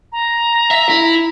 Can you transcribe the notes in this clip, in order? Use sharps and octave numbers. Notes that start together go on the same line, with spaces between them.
A#5
E5
E4